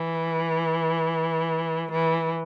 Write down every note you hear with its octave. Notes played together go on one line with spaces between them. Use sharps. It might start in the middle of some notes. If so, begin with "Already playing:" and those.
Already playing: E3
E3